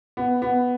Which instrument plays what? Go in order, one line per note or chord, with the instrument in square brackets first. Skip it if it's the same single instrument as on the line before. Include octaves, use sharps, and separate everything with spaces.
[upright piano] B3
B3